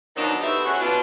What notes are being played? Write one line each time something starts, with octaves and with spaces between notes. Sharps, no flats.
B2 D#3 F3 F#3 D4 D#4
A3 B3 C4 E4 G4 E5
C#4 F#4 G#4
B2 D4 F4